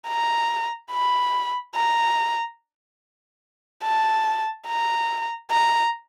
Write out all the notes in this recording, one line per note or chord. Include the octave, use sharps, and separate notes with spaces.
A#5
B5
A#5
A5
A#5
A#5